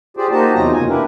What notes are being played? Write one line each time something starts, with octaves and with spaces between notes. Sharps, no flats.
F4 G4 G#4 C5 D5
A#3 D#4 F#4 G4 C5 A5
E2 C3 F#3 D#4 F4 A#5
F#2 C#3 A#3 G#5
D4 E4 G4 A#4 B4